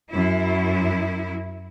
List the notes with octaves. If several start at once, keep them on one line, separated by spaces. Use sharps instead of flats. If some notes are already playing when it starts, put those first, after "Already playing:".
F#2 E4